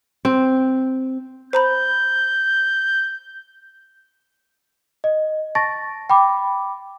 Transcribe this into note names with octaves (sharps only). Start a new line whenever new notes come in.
C4
C5 A#5 B5 G6
D#5
A5 C#6 A6 A#6
G5 B5 D6